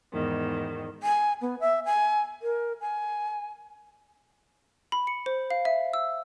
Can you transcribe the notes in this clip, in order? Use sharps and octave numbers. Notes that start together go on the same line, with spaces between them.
E2 G#2 D#3
G#5
B3
E5
G#5
A#4
G#5
B5
C#7
C5
F5
E5
E6